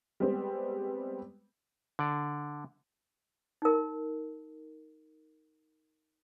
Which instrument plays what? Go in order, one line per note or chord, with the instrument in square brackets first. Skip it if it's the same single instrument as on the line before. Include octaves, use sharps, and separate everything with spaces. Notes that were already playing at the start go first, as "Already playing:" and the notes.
[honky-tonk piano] G3 G#3 B3 C4
[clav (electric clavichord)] D3 D5
[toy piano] D#4 A#4